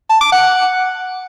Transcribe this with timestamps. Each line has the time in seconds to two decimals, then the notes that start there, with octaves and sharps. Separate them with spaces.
0.10 A5
0.21 D6
0.32 F#5